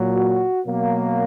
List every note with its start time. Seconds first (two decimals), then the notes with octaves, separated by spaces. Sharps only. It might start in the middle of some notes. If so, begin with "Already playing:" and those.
Already playing: A#2 F#3
0.13 F#4
0.65 B2 F#3 A#3